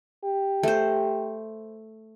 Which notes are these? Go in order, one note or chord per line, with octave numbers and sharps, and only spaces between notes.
G4
A3 C5